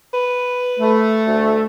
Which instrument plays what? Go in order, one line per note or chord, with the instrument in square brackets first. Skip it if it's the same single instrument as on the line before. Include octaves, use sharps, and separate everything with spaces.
[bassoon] B4
[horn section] A3
[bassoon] D2